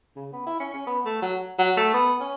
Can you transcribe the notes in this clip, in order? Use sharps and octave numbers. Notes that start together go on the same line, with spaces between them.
C#3
B3
E4
C#4
C#4
B3
A3
F#3
F#3
A3
B3
C#4